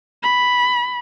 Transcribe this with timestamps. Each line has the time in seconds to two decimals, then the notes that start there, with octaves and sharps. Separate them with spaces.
0.23 B5